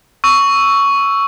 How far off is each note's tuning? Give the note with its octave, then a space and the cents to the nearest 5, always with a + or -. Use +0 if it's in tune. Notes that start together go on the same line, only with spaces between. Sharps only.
C#6 +10 E6 +0